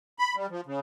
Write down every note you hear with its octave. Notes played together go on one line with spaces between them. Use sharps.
B5
G3
F3
C#3